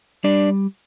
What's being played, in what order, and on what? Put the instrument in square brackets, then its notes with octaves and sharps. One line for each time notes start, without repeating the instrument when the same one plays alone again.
[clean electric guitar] G3 D4 D5